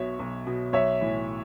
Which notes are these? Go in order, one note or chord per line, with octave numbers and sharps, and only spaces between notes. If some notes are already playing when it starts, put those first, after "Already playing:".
Already playing: B1 B2 C#5 E5
B1
B2
B1 C#5 E5
A2 E3